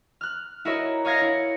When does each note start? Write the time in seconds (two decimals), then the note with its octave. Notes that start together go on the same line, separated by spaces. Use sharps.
0.21 F6 F#6
0.65 E4 F#4 A#4 C#5 D#5 E5
1.05 C#5 D#5 F5 G#6 A#6 C7
1.21 E4 C#7